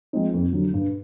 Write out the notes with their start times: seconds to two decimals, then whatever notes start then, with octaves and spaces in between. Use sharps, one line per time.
0.13 F3 G#3 C4 D#4
0.34 F2
0.53 D3 F#3
0.73 G2